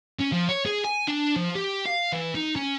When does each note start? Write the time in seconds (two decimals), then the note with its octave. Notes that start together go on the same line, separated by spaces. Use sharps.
0.19 C#4
0.32 F3
0.49 C#5
0.66 G#4
0.85 G#5
1.08 D4
1.36 F3
1.55 G4
1.86 F5
2.13 E3
2.35 D#4
2.56 C#4